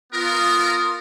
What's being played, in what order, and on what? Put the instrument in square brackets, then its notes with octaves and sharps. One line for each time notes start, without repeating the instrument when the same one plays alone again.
[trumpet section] B3 A#4 [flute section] F4 D#6